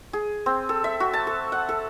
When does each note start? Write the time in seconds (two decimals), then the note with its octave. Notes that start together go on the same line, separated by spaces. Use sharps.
0.13 G#4
0.46 C4
0.69 A4
0.84 E5
1.00 F#4
1.13 A5
1.27 A4
1.52 F#5
1.69 A4